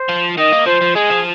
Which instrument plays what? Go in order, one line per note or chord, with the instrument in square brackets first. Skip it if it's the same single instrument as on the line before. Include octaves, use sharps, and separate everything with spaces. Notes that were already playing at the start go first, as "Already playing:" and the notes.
Already playing: [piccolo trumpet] C5
[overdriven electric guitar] F3
[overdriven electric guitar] D#3 [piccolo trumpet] D#5
[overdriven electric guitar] A#3
[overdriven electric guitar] F3 [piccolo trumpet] C5
[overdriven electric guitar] F3
[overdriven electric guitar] G#3 [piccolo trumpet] G#4
[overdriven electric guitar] F3